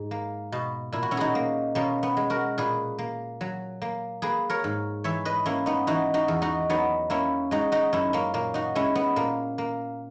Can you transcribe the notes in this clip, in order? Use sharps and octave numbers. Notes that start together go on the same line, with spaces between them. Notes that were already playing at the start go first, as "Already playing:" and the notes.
Already playing: G#2 G#4
A#3
B2
A#2 E4
F#4
C#4 E4
D#4 F#4 G#4
A#3
B2 A#3 C#4
B3
G#3
F#4 A#4
A#2 G#4 B4
A#3
F#3
A#3
A#3 G#4 B4
A#4 C#5
G#2
E3 C#5 E5
B4 D#5
A#3 C#4 E4
B3 D#4
E3 D#4 F#4
D#4 F#4
E2
D#4 F#4
F#3 B3 D#4
A#3 C#4 E4
G#3 D#4 F#4
D#4 F#4
F#2 C#4 E4
A#3 C#4
A#2 A#3
D#4 F#4
G#3 C#4 E4
B3
A#2 A#3
A#3